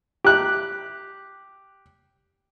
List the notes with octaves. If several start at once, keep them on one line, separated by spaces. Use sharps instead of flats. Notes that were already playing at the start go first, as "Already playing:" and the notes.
G4 F#6